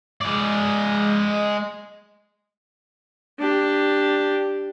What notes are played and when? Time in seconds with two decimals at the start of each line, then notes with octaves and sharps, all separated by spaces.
0.21 G#3 D5
3.39 D4 G4